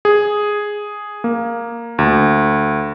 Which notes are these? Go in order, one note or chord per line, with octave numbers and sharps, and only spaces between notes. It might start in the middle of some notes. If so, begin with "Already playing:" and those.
G#4
A#3
D2